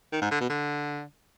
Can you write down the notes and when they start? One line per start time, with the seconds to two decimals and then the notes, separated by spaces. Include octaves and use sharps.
0.12 D#3
0.22 G#2
0.31 D3
0.40 B2
0.50 D3